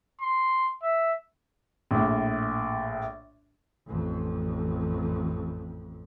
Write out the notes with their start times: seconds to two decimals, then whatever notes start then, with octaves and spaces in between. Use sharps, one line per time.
0.21 C6
0.83 E5
1.91 A#1 A2
3.88 A1 F2